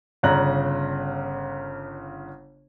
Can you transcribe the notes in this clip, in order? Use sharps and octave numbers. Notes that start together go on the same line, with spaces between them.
G1 C#3 D5 A#5 F#6 F#7